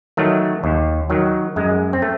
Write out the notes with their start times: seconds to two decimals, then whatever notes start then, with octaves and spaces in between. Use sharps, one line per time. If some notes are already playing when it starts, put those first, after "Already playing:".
0.17 D#3 F#3 A3
0.64 D#2
1.10 D#3 F#3
1.56 F#2 G#3
1.93 C4
2.02 A3